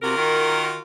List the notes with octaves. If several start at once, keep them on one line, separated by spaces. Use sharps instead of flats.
C3 F4 F#4 A#4
D#3